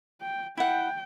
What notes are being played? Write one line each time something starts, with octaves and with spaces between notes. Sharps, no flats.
G5
E4 F#5 G5